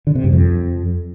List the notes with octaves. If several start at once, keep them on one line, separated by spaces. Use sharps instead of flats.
D3
C3
G2
F2